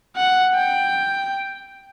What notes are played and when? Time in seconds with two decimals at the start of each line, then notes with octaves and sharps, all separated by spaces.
0.17 F#5
0.55 G5